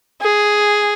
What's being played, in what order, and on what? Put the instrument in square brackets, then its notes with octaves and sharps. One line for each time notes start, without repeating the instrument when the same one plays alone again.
[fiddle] G#4